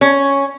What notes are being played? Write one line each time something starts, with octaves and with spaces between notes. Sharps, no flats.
C#4